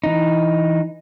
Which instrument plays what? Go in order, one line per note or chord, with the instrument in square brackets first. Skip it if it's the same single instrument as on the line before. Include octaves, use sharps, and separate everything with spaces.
[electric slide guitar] E3 D#4